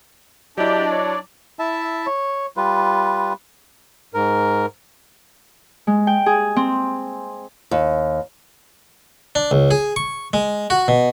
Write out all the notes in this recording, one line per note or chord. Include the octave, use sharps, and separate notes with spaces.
F#3 D4 E4 G4 D5 D#5
C#5
E4 E5 A5
C#5
G3 F4 B4
G#2 A#4
G#3
G5
G#4
C4
D#2
D4
C#2
G#4
C#6
G#3
F#4
B2